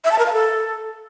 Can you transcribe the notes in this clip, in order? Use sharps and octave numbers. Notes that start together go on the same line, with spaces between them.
E5
A5
A#4
F5
A4